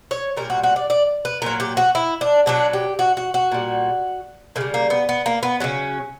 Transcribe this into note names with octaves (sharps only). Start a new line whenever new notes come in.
C#5
A#2 G3 A#4
F#4
F#4
D5
D5
B4
A#2 F#3 A#4
G4
F#4
E4
D4
B2 F#3 D4
G4
F#4
F#4
F#4
A#2 G3
C#3 G3 A#3
A#3
B3
B3
A#3
B3
C#3 F#3 C#4